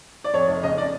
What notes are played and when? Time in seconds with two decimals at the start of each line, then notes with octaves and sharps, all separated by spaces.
0.24 D5
0.34 F2 C#5
0.48 F1
0.63 C#3 D#5
0.78 D5